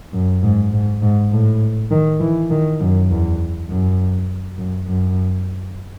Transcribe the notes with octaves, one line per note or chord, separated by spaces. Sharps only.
F#2
G#2
G#2
G#2
A2
D#3
E3
D#3
F#2
E2
F#2
F#2
F#2